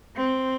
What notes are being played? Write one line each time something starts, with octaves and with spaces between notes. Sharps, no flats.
C4